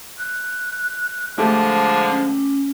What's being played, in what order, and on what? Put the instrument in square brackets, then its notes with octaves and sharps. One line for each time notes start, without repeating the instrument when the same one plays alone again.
[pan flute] F#6
[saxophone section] D3 F3 G#3 [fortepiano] A3 G4
[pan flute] C#4